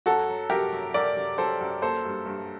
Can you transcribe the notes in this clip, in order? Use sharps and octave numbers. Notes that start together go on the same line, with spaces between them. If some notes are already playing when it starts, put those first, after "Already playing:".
F#2 F#4 A4
F#3
F#2 G4 A#4
F#2
F#2 A#4 D5
F#2
F#2 A4 C5
F#2
A#3 A4 C5
G2
G2